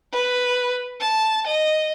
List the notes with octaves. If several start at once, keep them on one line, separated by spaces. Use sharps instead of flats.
B4
A5
D#5